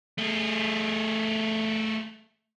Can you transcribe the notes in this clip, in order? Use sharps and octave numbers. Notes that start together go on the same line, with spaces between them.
A3 G#4